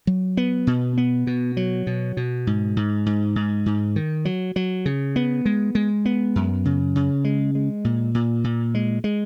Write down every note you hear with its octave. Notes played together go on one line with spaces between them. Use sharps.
F#3
B3
B2
B3
B2
F#3
B2
B2
G#2
G#2
G#2
G#2
G#2
D#3
F#3
F#3
C#3
B3
G#3
G#3
B3
F#2
C#3
C#3
G#3
G#3
A#2
A#2
A#2
G#3
G#3